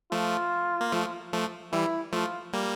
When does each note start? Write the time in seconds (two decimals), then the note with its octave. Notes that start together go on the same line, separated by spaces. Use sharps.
0.12 F3 A3 F4
0.81 A#3
0.92 F3 A3
1.33 F3 A3
1.73 E3 G3 E4
2.13 F3 A3 F4
2.53 G3 A#3